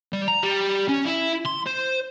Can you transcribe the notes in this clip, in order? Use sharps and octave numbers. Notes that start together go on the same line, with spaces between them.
G3
A#5
G3
C#4
E4
C6
C5